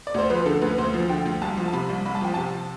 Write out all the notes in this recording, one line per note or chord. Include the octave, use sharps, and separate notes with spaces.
D5
D2 C5
F3 B4
D3 A4
D2 B4
D2 C5
F3
D3 G5
D2
C2 A5
F3
A5
C3 B5
C2
C2 B5
A5
F3 G5
C3 A5